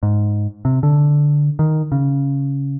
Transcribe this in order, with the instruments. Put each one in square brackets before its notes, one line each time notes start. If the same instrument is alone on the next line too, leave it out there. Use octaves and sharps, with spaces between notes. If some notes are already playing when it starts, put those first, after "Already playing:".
[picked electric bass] G#2
C3
D3
D#3
C#3